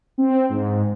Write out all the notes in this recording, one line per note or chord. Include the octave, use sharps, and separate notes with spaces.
C4
G#2